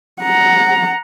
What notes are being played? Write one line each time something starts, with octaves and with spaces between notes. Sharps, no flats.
F#5 A#5